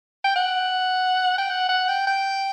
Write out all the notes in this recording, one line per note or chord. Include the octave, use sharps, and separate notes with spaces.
G5
F#5
G5
F#5
F#5
G5
G5